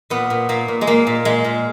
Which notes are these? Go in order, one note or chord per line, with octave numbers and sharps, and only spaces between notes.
A#2 B3
A#2
A#2 A#3
A#2
G#3
A#2 A#3
A#2
A#2 G#3
A#2